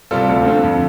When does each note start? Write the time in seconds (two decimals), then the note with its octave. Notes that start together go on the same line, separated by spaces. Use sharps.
0.11 C3 G3 C4 F4 A4
0.29 D2
0.46 D3 A3 C4
0.63 F2